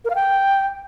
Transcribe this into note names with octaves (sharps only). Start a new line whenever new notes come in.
A#4
F5
G5